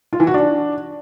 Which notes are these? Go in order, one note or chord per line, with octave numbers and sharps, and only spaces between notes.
F4
E3
F#4
D4